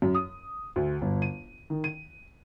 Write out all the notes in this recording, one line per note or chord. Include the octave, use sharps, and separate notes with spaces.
F#2
D#6
D2
G1
D#7
D#3
D#7